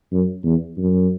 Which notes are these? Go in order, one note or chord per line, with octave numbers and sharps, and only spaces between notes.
F#2
E2
F#2